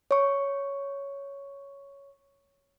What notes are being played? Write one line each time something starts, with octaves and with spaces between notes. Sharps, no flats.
C#5 C#6